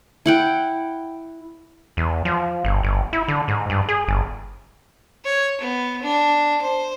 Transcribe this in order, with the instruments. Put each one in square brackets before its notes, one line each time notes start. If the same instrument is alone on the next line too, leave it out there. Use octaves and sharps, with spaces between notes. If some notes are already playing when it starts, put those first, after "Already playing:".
[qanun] E4 F#5 G5
[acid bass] E2
F3
G1
G1
E4
D3
G#2
G2
G#4
G1
[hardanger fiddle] C#5
B3
D4
C5